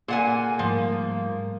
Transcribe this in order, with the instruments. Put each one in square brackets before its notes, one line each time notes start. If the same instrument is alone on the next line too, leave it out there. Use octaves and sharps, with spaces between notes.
[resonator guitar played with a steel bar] A#2 F#5 G#5 [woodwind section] A#3 [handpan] G#4 A4
[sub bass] G#2 [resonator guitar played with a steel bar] F3 [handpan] G3 A3 A#4